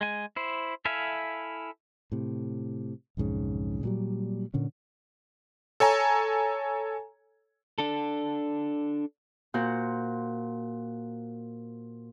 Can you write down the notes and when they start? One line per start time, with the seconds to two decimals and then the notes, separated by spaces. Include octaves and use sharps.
0.01 G#3 G#5
0.36 E4 C5
0.85 E4 A4 E5 F5 G#5
2.12 A2 C3
3.17 B1 F2 G#2 C#3
3.83 A#2 F#3 G3
4.54 A#2 D3 C#4
5.80 A4 C#5 G#5 A#5
7.78 D4 A4
9.54 A#2 F#4 C5